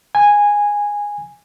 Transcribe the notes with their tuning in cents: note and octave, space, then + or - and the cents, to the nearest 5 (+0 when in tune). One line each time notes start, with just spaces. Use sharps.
G#5 -10